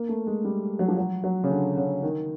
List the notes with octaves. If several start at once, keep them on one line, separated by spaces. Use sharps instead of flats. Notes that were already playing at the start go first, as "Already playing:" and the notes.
Already playing: A#3
A3
G#3
G3
F#3
F3
F#3
F#3
C#3
D3
C#3
D#3